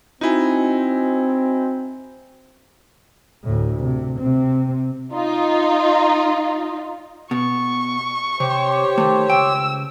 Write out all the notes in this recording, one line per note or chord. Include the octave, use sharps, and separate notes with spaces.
C4 D#4 E4 F#4 D#5 G#5
D2 A2
C3
C3 C4
D#4 F4
B2 C#6
C3 G4 C5 C#5
D#3 A3
C#2 G5 E6